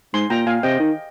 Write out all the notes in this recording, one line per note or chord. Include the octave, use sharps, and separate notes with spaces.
G#2 G#5 C6
A#2 G5 A#5
A#2 F5 G#5
C3 D#5 G5
D#3